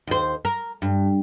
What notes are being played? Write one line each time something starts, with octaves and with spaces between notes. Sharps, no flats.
D#2 C5
A#4
G2